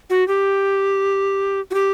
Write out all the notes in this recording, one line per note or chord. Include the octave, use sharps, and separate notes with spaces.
F#4
G4
F#4
G4